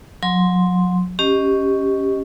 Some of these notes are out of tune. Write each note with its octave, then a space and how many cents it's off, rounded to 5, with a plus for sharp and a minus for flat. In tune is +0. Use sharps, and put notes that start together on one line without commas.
F#3 -35 C6 +0
C#4 +0 G4 +0 D#5 +0